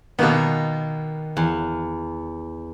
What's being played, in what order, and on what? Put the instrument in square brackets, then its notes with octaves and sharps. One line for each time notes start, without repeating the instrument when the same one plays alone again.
[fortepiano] B2 A#3 B3 [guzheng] D#3
[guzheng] E2